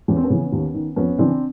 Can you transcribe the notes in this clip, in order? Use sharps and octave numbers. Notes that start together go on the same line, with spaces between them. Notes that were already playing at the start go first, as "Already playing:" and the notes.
E2 C#4
C4
B3 C#4
C#3 E3
D#2
D#3
F2 B3 C#4
C#3 E3 C4 D4